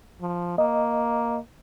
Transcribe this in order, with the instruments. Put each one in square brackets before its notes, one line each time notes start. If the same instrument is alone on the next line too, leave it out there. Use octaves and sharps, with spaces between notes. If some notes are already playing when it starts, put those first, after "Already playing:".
[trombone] F3
[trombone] A#3 [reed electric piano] D#5